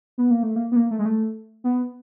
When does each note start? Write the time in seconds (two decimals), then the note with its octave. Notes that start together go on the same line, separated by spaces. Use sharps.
0.18 B3
0.31 A#3
0.43 A3
0.56 A#3
0.72 B3
0.76 A#3
0.91 A3
0.99 G#3
1.05 A3
1.64 B3